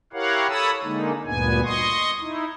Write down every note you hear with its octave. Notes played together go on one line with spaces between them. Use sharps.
E4 G4 A#4 C#5 F5 F#5
A4 C#5 A5 B5 D#6 E6
D3 G#3 A#3 D#4
D2 G2 A#2 B3 G#5
D#5 C6 C#6 D#6
D#4 E4